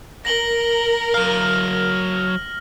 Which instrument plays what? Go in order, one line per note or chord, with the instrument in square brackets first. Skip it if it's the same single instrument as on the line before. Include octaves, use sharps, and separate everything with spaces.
[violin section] A#4 [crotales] A#6 F#7 G7
[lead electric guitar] F#3 F5 [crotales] F6